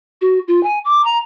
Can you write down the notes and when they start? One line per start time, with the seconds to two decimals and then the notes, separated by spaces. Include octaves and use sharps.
0.22 F#4
0.48 F4
0.63 G#5
0.85 D6
1.04 A#5